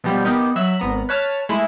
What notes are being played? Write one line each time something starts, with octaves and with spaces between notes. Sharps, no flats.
B2 F3 G3 B3
B3 D#4 G4 A#4
F#3 E5 F#6
G#1 B3 A#5
B4 C#5 A5 F6 A6
G#3 A3 E4